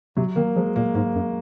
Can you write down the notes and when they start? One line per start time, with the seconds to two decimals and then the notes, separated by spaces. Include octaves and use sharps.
0.17 C3 F#3
0.36 D#3 A#3
0.56 F3 G#3
0.76 A#2 A#3
0.95 G#2 A#3
1.15 F#2